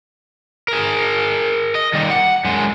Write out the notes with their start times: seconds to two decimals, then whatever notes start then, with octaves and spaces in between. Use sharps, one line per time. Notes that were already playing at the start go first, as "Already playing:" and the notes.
0.68 G#4 A#4
1.75 D#5
1.93 D#3 G3
2.10 F#5
2.45 F#2 G#3